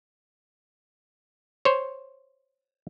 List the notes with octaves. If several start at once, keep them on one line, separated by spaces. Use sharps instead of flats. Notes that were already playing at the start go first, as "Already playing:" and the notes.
C5 C#5